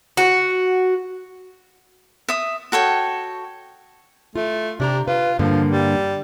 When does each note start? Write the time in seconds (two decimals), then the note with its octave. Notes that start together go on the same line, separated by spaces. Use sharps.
0.17 F#4
2.29 E5 D#6
2.72 F#4 A4 C#5 G5
4.35 A3 F4
4.80 C3 D4 G4 A#5
5.08 F4 B4
5.39 G2 D3 F3 A#3
5.72 G3